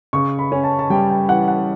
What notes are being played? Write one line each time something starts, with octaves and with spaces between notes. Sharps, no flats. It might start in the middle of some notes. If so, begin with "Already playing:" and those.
C#3 C#6
B5
C#4
A5
A5
G3 G5
G5
E3 F#5
F#5